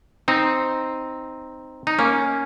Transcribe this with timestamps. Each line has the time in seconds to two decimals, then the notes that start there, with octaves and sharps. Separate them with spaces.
0.28 C4 D#4
1.87 D#4
1.99 A#3 C#4